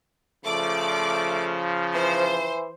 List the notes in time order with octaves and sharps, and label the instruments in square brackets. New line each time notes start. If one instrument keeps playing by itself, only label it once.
[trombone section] C#3 F3 [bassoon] A3 [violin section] D5 D6
[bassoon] E3 [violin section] C5